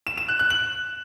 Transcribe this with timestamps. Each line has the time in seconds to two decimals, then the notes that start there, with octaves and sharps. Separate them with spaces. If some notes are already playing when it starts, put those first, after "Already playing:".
0.07 E7
0.17 E7
0.28 F#6
0.39 F#6
0.50 F#7